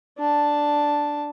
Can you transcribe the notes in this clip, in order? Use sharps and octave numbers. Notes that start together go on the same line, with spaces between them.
D4 A5